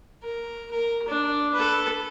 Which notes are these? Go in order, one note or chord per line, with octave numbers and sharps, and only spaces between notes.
A#4
A#4
D4
A4 B4